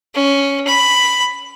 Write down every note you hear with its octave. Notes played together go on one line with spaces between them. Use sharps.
C#4
B5